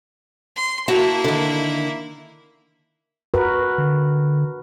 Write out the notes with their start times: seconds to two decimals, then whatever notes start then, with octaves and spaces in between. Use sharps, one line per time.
0.56 C6
0.88 A#3 E4 F#4 A5
1.24 D3 D#3
3.34 F#4 A#4 B4
3.78 D3